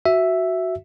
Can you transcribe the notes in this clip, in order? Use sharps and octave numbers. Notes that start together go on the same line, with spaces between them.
F#4 E5